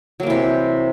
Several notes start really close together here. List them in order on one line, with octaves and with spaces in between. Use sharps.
F#3 A#3 E3 C3